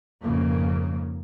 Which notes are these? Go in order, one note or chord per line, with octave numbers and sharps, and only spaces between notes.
F2 G#2 C#3 A#3